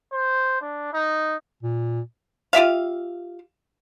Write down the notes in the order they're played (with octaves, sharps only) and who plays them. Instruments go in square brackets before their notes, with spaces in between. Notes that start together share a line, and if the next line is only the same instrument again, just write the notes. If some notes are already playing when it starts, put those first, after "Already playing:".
[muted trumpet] C5
D4
D#4
[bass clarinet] A#2
[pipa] F4 G4 E5 F5